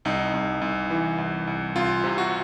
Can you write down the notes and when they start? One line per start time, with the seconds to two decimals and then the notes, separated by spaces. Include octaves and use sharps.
0.05 C2 D#4
0.33 C2
0.62 C2
0.90 E3
1.18 C2
1.47 C2
1.76 C2 F4
2.04 C3
2.18 F#4